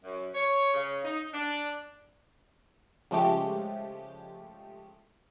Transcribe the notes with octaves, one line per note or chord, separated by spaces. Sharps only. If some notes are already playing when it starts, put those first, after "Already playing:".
F#2
C#5
C#3
D#4
D4
C#3 F3 G#3 A3 G4